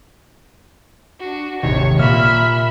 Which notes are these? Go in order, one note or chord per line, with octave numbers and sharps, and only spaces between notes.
D4 F#4
G#1 D#2 C3 D#3 C#5
A#2 A#3 E5 B5 F6